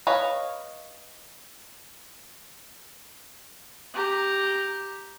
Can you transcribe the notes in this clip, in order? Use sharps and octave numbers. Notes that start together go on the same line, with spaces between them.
B4 C#5 D#5 F5
G4 A#5